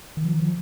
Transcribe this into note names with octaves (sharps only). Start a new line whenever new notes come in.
D#3
F3
D#3
F3